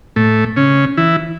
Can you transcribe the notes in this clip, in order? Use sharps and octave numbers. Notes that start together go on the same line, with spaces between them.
A2 A3
C#3 C#4
E3 E4